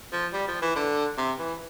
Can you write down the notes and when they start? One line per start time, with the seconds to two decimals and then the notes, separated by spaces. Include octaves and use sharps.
0.12 F3
0.33 G3
0.48 F3
0.62 E3
0.76 D3
1.18 C3
1.39 E3